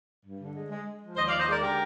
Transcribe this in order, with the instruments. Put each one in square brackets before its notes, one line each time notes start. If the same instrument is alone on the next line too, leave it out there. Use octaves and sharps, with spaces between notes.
[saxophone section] G2
D3
G#3
G#3
G#3
F3
D#2 C5 D#5
D5 F5
D#2
C5 D#5
G#3 A#4 D5
D3 G4 A#4